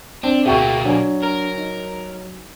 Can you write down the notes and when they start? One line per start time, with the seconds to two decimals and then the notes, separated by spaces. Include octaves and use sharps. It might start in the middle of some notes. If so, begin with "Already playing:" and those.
0.24 C4 D4
0.46 D2 B2 A#3 F#4 G#4 E5 G5 C#6
0.85 F#3 D4 G#5
1.22 A#4
1.58 D#4